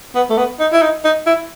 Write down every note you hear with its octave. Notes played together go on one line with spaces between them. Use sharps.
B3
A3
B3
D#4
E4
D#4
D#4
E4